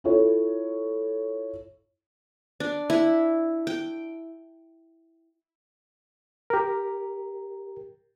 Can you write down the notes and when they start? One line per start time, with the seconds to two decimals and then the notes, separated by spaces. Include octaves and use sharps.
0.04 E4 F4 A4 C#5
2.60 D4
2.90 E4
3.67 G5
6.50 G4 A#4